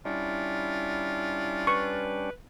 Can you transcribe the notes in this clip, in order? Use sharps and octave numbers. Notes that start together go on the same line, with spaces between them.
G3 C#4 D4 E4 F4
B4 C#6